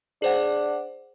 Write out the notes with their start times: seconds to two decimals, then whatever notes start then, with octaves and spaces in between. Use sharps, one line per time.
0.22 D4 G#4 C5 F#5